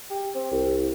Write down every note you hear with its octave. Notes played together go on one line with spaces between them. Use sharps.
G4
C4
C2